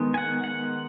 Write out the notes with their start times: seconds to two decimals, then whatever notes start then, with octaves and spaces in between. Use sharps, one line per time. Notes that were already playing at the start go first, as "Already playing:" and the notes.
Already playing: D#3 G#3 B3
0.14 G#5
0.18 F#5
0.44 F#5